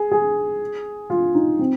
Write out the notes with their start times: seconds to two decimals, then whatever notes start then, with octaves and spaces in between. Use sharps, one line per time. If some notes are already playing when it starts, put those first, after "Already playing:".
Already playing: G#4
0.11 G#4
1.10 F4
1.35 D#4
1.59 C4